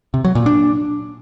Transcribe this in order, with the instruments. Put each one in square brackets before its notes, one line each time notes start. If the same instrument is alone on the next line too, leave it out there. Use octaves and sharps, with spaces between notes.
[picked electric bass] C3
F#3
A#2
D4